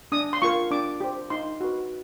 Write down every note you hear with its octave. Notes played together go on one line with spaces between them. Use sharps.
D4 D#6
C6
F4 A#4 C#6
D4 D6
G4 C5
D#4 C6
F#4 B4